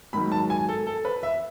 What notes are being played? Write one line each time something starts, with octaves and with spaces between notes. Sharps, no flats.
G#2 D#3 F#3 B5
A5
G#5
A4
A4
B4
E5